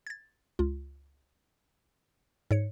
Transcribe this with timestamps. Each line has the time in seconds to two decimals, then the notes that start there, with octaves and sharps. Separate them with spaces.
0.07 G#6 A6
0.59 C#2 F4
2.51 G#2 C#5 C#7